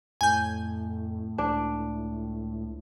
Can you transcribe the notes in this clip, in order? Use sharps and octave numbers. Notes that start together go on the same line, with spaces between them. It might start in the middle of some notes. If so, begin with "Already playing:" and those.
F2 A2 G#5 G6
C#2 D4